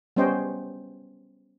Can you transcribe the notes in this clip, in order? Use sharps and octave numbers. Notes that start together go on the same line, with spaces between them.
G3 B3 C#4 C5 D#5 G5